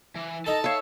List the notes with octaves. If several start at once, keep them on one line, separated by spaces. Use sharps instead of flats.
E3
D#4 A4 D#5 A5
C#5 E5 F5